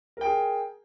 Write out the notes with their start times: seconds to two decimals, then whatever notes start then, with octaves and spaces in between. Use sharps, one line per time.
0.17 A#4
0.21 G5
0.25 G#4